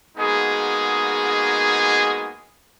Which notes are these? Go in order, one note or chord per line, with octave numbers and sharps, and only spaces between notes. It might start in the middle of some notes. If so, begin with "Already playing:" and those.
G#3 A#3 B3 D#4 F#4 G#4